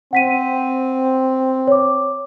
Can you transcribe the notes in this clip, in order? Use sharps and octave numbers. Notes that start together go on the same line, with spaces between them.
C4 F#5 B6 D#7
C#5 D6